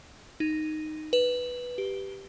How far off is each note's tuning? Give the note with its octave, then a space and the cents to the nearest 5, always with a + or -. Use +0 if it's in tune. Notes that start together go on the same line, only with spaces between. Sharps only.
D#4 -5
B4 -5
G4 -5